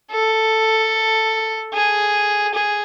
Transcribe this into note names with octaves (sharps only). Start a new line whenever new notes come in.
A4
G#4
G#4